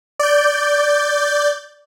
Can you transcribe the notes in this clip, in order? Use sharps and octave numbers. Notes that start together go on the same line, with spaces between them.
D5 G6